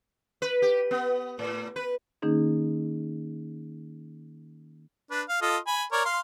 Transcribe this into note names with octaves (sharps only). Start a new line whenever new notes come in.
B4
G4
B3
A2
B4
D#3 A#3 C#4 D#4 G#4
D4 B4
F5
F4 A4 D#5
G#5 B5
A#4 C#5 D5
F5 C6